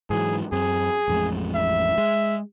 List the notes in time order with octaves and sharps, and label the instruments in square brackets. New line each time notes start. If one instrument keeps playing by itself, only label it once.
[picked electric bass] G#2 E3 F#3 [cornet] G#4
[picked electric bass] F#2 C4 [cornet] G#4
[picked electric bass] A1 F2 G#3
[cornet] E5
[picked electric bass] G#3